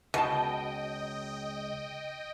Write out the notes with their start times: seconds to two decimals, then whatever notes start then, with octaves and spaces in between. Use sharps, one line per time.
0.14 C#2 B2 D#5 G5 A5